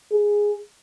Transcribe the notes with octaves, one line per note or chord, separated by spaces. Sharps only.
G#4